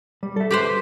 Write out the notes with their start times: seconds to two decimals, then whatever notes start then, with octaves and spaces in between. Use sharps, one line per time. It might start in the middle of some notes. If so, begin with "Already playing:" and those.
0.23 G3
0.36 A4 E5
0.51 G4 B4 C5